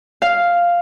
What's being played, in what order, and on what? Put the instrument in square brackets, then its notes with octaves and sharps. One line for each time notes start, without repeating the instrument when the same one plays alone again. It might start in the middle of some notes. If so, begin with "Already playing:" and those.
[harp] F5